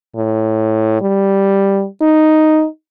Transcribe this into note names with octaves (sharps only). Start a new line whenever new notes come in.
A2
G3
D#4